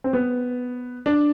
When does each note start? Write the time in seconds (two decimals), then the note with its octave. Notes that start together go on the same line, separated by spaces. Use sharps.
0.04 C4
0.13 B3
1.06 D4